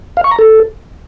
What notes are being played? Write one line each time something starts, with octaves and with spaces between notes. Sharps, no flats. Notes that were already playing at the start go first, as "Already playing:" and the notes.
F5
C#6
A#5
A4